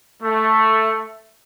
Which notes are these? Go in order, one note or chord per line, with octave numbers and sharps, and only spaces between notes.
A3